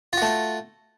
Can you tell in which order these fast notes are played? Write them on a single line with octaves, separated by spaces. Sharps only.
F4 F#4 A3